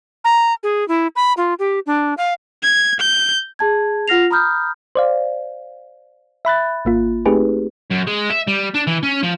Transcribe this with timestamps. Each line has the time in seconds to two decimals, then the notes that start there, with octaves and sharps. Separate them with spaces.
0.24 A#5
0.63 G#4
0.88 E4
1.16 B5
1.37 F4
1.59 G4
1.86 D4
2.17 F5
2.63 G#6
3.00 G6
3.59 G#4 A5 G#6
4.08 F4 F#5 F6 A#6 C7 F7
4.31 A#5 B5 D#6 F6 G6
4.95 C5 D5 F5
6.45 E5 B5 F#6 A6
6.85 G#1 A#3 F4
7.26 A3 C4 D#4 G4 G#4 B4
7.90 F#2
8.07 G#3
8.30 E5
8.47 G3
8.74 D4
8.87 E3
9.03 C#4
9.23 F3